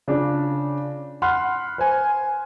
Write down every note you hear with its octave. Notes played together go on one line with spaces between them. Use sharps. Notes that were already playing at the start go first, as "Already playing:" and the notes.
C#3 D4 F4
F#5 B5 C6 F6 F#6
C5 G#5